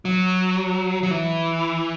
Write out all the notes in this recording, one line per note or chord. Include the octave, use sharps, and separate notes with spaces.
F#3
F#3
E3